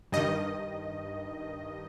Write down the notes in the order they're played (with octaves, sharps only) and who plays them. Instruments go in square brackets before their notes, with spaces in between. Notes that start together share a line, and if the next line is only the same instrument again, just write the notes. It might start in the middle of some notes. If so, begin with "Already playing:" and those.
[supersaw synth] G2 D#3 D#5